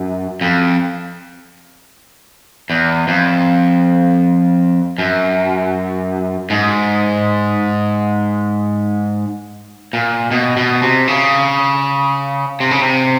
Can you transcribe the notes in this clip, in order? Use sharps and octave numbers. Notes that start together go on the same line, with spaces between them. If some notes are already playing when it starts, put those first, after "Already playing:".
Already playing: F#2
F2
E2
F2
F#2
G#2
A#2
B2
B2
C3
C#3
C3
C#3
C3